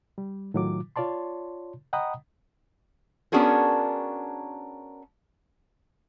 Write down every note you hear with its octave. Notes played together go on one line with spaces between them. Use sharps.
G3
A2 D#3 F#3 F4 D6
F4 C#5 D5 A5 C6
D#5 F#5 G5 A#5 B5 D#6
B3 C#4 D4 F#4 G#4 A#4